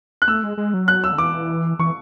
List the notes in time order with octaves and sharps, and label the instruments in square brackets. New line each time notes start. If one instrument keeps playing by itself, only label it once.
[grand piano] F#6
[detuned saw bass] A3 [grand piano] E6
[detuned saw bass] G#3
G#3
F#3
[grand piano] F#6
E6
[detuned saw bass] D3
[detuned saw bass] E3 [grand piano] D6
[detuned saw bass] E3 [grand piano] C#6